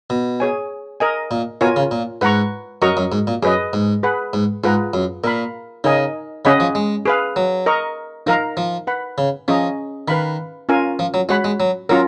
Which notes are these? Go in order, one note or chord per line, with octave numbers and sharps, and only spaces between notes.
B2
G#4 C#5 G#5
A#4 D#5 G#5
A#2
B2 F4 A#4 C#5 G#5
C#3
A#2
G#2 B4 F#5 A#5 C#6
F#2 F#4 A#4 D#5 A#5 C#6
F#2
G#2
A#2
F#2 G#4 B4 D#5
G#2
G#4 B4 F#5 B5
G#2
G#2 F4 G#4 B4 F#5 A#5
F#2
A#2 A#4 F5 B5
C#3 D#4 A#4 D#5 G#5
C#3 C#4 G#4 D#5 F#5 B5
F3
G#3
G#4 B4 F5
F#3
A#4 D#5 A#5 C#6
F3 D#4 A#4 F5 A#5
F3
B4 F#5 B5
C#3
F3 C#4 G#4 D#5 A#5
D#3 B4 F5 B5
C#4 F4 A#4 F5 G#5
F3
F#3
G#3 F#4 C#5 F#5 B5
G#3
F#3
F#3 C#4 F4 A#4